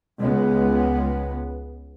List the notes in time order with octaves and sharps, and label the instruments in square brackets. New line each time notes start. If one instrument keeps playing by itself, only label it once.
[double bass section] C#2 G#3 B3